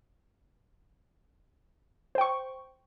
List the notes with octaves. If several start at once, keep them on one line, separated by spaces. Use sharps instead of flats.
C5 G5 C#6